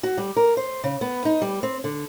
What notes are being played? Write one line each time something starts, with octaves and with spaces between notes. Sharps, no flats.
F#4
G3
A#4
C5
C#3
B3
D#4
G3
C4
D3